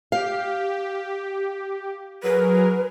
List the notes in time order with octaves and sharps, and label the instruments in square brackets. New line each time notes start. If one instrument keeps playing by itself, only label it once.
[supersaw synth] G4 [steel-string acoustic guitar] F5
[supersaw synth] F#3 G#4 A#4 [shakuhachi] B4